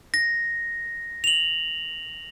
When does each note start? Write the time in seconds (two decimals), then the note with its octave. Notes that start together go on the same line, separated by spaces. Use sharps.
0.14 A#6
1.24 F7 F#7